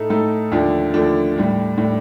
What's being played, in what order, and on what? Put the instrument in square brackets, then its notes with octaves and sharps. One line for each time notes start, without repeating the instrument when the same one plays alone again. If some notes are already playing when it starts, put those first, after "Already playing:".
Already playing: [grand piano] A2 A3 D#4 A4
A2 A3 D#4 A4
D#2 D3 F3 A3 D4
D#2 D3 F3 A3 D4
A2 G3 D4
A2 G3 D4